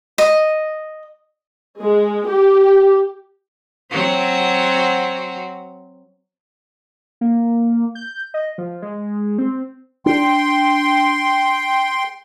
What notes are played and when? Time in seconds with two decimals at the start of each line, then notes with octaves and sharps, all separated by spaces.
0.18 D#5
1.81 G#3
2.28 G4
3.91 F#3 C4 F#4
7.21 A#3
7.95 G6
8.34 D#5
8.58 F3
8.82 G#3
9.38 C4
10.06 D4 G5 C6